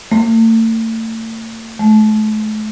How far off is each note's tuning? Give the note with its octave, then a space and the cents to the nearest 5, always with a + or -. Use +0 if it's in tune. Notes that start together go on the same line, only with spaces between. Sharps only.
A3 +40
A3 -40